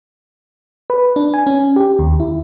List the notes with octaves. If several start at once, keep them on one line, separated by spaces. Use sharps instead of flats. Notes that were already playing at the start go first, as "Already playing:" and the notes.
B4
D4
G#5
C#4
G4
D#2
E4